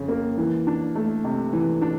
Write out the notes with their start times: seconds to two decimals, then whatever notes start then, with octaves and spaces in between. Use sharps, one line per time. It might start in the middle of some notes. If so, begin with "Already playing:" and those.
Already playing: F2 C#3
0.08 A#3
0.38 E3
0.67 D4
0.95 A3
1.24 C3
1.53 E3
1.81 D4